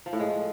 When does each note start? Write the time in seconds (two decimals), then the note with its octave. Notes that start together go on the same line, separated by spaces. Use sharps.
0.06 F3
0.13 A2
0.20 G#3